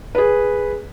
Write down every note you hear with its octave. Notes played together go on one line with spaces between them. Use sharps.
G#4 B4